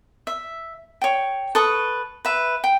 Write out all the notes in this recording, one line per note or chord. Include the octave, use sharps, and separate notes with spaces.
E5
C#5 G5
A4 B4 C#6 D#6
B4 E5
G5